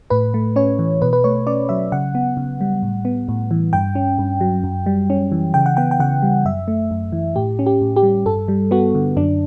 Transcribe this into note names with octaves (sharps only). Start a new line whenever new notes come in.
A2 B4
A3
C#4 C#5
E3
B2 B4
B4
A3 C#5
C#4 D5
F#3 E5
C#3 F#5
B3
C#3
G3
A2
B3
A2
E3
G2 G5
C#4
G2
F#3
F#2
G3
C#4
E3
C#3 G5
F#5
B3 G5
G5
C#3 F#5
G3
F#2 E5
A3
F#2
E3
A2 G4
C#4
G4
A2
G4
G3
G2 A4
G3
B3 F#4
D3
F#2 D4